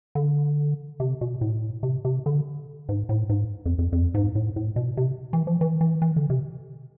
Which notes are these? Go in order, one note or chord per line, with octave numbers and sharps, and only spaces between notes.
D3
C3
B2
A2
C3
C3
D3
G#2
A2
G#2
F2
F2
F2
G#2
A2
A2
B2
C3
E3
F3
E3
E3
E3
D3
C3